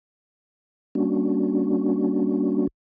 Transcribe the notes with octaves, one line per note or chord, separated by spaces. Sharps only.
G3 A#3 C#4 D4 F#4